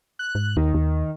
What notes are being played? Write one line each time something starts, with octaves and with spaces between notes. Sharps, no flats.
F#6
G#2
D#2 D#3
D#2